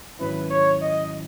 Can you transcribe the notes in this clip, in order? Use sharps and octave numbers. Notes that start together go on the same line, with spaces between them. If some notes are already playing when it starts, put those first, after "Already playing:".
G#2 D#3 F#3 C#4 E4 B4
C#5
D#5